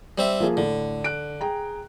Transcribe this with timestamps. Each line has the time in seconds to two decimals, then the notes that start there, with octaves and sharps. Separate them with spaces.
0.18 G3 C4 E5
0.40 F3 A#3 G#4
0.57 A2 D3
1.04 F#6 D7
1.41 G#4 G5 A#5